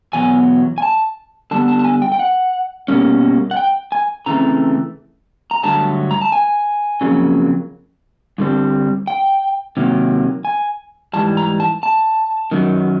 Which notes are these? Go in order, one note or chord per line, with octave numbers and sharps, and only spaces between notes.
E2 B2 F#3 G#5
G#5
A5
D3 G3 B3 A5
A5
A5
G#5
G5
G5
F#5
B2 G3 A#3 C#4
F#5
G5
G#5
C#3 E3 A3 C4 A#5
A#5
G2 D3 F#3 A3 A5
A#5
A5
G#5
F2 C#3 F#3 A#3
G2 D3 G3 C4
G5
C3 D#3 F#3 A#3
G#5
G#2 E3 G3 A5
A#5
A5
A5
F#2 D#3 F#3